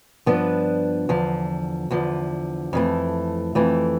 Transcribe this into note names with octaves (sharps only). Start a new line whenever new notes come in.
G2 F3 B3 D4
E2 D3 F3
E2 D3 F3
F2 E3 A3
F2 E3 A3